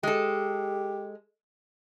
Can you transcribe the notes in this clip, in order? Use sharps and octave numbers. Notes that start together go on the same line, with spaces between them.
G#3 G4 A4